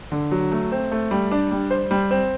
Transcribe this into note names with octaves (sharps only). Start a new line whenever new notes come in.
D3
F#3
A3
C4
A3
G3
D4
G3
C5
G3
C4